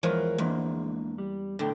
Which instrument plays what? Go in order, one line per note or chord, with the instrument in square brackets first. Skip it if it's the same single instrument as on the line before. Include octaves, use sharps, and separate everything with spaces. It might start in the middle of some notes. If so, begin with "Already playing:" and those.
[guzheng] E2 F3 G#3 [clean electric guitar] A#4 C#5
[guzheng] E2 [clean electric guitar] G#3 A#3 D4
[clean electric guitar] G3
[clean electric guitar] B1 A2 G5 [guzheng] D3